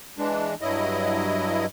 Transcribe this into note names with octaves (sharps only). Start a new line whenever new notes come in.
E3 G#3 D4
G2 F#3 E4 D#5